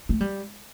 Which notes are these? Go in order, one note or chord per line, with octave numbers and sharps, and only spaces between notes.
A3
G3